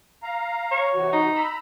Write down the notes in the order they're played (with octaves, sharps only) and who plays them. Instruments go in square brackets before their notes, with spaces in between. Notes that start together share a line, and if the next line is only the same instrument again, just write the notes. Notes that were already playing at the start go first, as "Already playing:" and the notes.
[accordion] F5 A#5
[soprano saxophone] C#5
[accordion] C3 E3 F#4
[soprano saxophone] D#4
[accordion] A#5 B5 E6